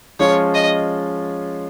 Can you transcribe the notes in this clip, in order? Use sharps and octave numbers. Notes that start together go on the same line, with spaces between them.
F3 G#3 C#4 F4 C#5
D#5